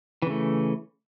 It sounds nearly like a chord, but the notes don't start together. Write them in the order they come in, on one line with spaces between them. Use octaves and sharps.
E3 C#3 A3